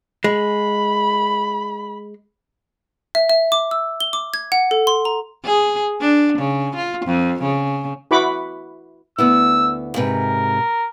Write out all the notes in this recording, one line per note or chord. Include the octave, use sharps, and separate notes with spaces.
G#3 B5
E5
E5
D6
E6
G7
D6
G#6
F#5
A4
C6
A#5
G#4
D4
C#3
F4
F2
C#3
E4 F#4 B4 B5 C#6 D6
D2 B3 E4 E6
G#2 C3 A#4 B4